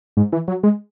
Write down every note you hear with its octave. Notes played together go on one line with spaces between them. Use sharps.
G#2
E3
F#3
G#3